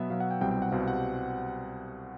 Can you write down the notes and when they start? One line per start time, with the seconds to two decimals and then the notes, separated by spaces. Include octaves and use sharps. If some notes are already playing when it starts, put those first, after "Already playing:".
Already playing: B2 F#3 B3 E5
0.10 B2 F#3 B3 F5
0.20 F#5
0.31 G5
0.41 C2 B2 G3 C4 G5
0.51 G5
0.62 F#5
0.72 C2 B2 G3 C4 F5
0.88 F#5